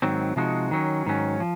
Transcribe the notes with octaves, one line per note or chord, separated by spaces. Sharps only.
G#2 D#3 F#3 C4
C3 F3 G#3 D#4 F#4
D#3 F#3 C#4
G#2 D#3 F#3 C#4
F3